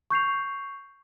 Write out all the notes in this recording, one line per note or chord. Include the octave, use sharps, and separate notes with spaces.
C#6 G6 C7 F7